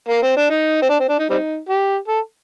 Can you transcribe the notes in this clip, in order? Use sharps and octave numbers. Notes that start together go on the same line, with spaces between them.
A#3
C4
D4
D#4
C4
D4
C4
D4
D#4
G3 C4 D#4
G4
A4